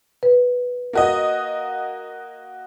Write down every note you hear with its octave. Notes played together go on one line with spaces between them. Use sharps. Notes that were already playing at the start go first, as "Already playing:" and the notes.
B4
A#3 F#4 D#5